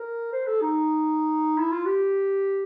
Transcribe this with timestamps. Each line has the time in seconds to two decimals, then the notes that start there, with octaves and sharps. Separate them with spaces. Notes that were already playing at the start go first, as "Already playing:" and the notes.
Already playing: A#4
0.32 C5
0.47 A4
0.61 D#4
1.58 E4
1.72 F4
1.85 G4